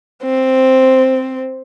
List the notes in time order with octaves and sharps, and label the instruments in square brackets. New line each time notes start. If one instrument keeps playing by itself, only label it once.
[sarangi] C4